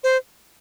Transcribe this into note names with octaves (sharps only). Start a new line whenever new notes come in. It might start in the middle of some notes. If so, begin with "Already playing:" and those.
C5